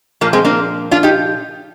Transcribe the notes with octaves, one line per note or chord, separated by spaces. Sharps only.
A#2 F3 A#3
G#3 C4
A#3 D4
D4 F4
D#4 G4